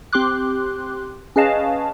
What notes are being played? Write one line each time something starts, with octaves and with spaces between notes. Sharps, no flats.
C4 G4 C6 D6 F#6
C#4 G#4 B4 D#5 F5 A5